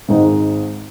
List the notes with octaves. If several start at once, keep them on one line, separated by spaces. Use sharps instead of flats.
G#1 G#2 D#3 G#3 D#4